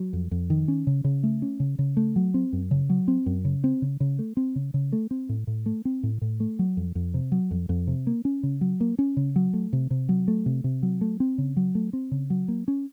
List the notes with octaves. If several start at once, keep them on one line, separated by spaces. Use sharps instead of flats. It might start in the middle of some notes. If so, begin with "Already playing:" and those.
Already playing: F#3
F2
F2
D#3
C#4
C#3
C#3
A3
C#4
C#3
C#3
A3
F#3
C4
F#2
C#3
F#3
C4
F#2
C#3
C4
C#3
C#3
A3
C4
C#3
C#3
A3
C4
A2
A2
A3
C4
A2
A2
A3
F#3
F2
F2
C3
F#3
F2
F2
C3
A#3
C#4
C#3
F#3
A#3
C#4
C#3
F#3
A3
C3
C3
F#3
A3
C3
C3
F#3
A3
C4
C#3
F#3
A3
C4
C#3
F#3
A#3
C#4